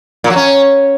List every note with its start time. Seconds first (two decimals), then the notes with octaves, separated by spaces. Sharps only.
0.24 A#2
0.30 F#3
0.36 C#4